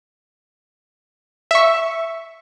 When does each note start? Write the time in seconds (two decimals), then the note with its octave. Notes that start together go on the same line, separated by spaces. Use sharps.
1.51 E5 C#6